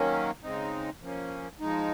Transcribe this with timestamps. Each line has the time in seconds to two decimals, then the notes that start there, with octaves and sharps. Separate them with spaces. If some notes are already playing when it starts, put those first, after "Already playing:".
Already playing: D#3 F#3 A#3 C#4
0.43 C#3 G#3 C4 D#4
1.01 F3 A#3 C#4
1.60 F3 G#3 D#4